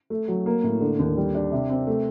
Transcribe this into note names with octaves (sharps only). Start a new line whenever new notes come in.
A3
F#3
A#3
A2
D3
D#2
G3
D4
C3
C4
A3